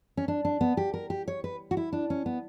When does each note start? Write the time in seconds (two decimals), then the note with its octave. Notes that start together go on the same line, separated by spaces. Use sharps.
0.17 C#4
0.28 D4
0.45 D4
0.61 B3
0.77 G4
0.94 A#4
1.10 G4
1.28 C#5
1.44 B4
1.71 F#4
1.77 E4
1.93 D4
2.10 C#4
2.26 B3